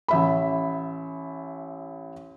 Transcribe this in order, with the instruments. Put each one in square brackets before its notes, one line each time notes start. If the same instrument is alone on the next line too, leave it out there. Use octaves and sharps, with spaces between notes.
[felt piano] A1 E5 B5